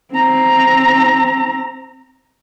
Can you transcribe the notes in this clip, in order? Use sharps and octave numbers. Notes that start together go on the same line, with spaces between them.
C4 A#5